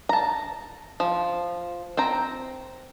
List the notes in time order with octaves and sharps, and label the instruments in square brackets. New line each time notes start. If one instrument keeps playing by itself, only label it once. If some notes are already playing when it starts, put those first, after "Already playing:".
[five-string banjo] A5 A#5
F3
C4 C5 A#5